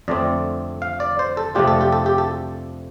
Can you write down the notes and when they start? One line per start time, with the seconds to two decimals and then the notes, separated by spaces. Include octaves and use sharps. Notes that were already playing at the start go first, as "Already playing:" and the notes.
0.08 F2 D3 A3 C4 D5
0.82 F5
1.00 D5
1.19 C5
1.37 A4
1.55 F2 C3 A3 D4 F4 G4
1.67 A4
1.81 G4
1.92 A4
2.06 G4
2.18 A4